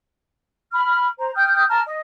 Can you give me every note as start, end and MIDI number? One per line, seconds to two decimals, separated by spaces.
0.73 1.06 83
0.73 1.06 89
1.18 1.30 72
1.18 1.30 82
1.35 1.64 79
1.35 1.64 87
1.35 1.64 89
1.35 1.64 91
1.68 1.80 81
1.68 1.80 82
1.68 1.80 89
1.86 2.00 75